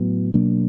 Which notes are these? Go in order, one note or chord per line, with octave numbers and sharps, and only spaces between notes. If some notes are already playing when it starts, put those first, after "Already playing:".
Already playing: A2 F#3 B3
B2 F#3 A#3 D4